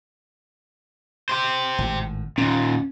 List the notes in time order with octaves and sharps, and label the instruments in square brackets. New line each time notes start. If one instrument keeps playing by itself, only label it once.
[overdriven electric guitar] G4 C5
[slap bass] G#1 A2
[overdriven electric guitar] D#2 A#2 [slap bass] C#4